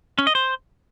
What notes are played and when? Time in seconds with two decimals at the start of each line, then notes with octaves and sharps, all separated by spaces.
0.19 C#4
0.27 D#5
0.35 C5